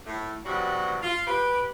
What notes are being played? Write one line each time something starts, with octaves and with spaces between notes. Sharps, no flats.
A2
E2 G2 C3 F#3 G3 F#4
F4
G4 B4